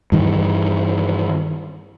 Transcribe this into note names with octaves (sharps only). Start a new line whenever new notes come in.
G2 D#3 E3